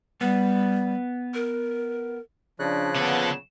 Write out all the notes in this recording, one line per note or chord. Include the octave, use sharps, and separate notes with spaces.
G3 B3
A#4
C#3 F3 D4 F#6
A#2 D3 B3 A4